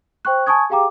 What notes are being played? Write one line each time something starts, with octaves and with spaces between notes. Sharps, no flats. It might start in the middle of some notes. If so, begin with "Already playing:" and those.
C5 G5 C#6 F#6
G#5 A5 C#6 D#6 G#6
G4 G#4 F5 G5 A#5 D6